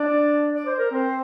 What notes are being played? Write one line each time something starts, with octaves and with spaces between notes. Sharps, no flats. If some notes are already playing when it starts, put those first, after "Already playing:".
Already playing: D4 D5
D5
C5
A#4
C4 C5